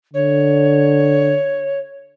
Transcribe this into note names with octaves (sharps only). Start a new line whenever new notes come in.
D3 C#5